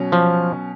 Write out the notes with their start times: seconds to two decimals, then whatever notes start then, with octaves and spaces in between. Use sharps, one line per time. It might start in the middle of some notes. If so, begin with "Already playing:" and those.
Already playing: B2 F#3 C#4
0.12 F3